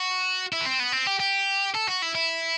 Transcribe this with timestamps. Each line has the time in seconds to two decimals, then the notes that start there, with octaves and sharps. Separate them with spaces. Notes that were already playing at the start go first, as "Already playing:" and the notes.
Already playing: F#4
0.53 E4
0.61 B3
0.65 C4
0.80 B3
0.92 C4
1.07 G4
1.20 G4
1.74 A4
1.88 F#4
2.02 E4
2.15 E4